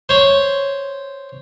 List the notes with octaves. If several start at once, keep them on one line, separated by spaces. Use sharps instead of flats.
C5 C#5